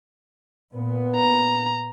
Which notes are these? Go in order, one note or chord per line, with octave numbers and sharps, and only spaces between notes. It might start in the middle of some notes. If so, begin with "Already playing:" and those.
A#2 B3
A#5